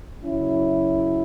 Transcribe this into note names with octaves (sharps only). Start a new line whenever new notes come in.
F#2 C#3 F#3 C#4 E4